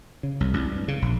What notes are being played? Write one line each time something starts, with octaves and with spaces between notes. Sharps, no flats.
C#3
C2
C2
G2
C#3
A#1